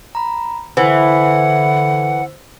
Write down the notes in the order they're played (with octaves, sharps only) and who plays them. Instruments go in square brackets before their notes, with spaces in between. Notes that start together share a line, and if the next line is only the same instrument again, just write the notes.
[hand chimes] A#5 B5
[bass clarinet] D3 [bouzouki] E3 [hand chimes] C5 E6 [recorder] F#5